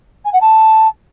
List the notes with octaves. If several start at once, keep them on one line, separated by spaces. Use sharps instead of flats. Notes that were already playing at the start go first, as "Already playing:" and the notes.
G#5
F#5
A5